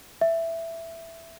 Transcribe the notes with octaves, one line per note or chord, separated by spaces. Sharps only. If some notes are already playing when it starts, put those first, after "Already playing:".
E5